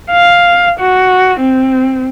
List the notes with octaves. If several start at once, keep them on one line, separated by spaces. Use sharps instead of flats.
F5
F#4
C4